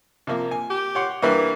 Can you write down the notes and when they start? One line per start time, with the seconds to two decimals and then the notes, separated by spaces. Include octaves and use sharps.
0.27 C3 F3 A#3
0.51 G#5
0.70 G4
0.95 C#5 F#5 C6
1.22 G2 E3 G3 A#3